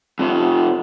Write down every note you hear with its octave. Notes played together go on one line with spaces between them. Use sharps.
F2 C3